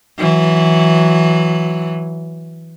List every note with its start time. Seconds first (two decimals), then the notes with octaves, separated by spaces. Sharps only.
0.18 E3 F#3